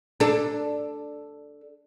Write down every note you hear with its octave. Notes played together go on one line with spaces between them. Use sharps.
D4 A4